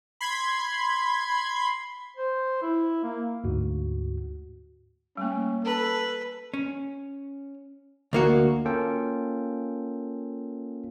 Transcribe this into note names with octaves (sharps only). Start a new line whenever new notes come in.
B5 C6 G#6
C5
E4
A#3
D2 G#2 F#4
G3 A3 A#3 C#4
A4 B4
C#4
D2 A#3 F#4
A#3 C#4 F4 A4 G5